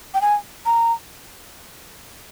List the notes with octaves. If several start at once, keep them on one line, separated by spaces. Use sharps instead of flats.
G5
G#5
A#5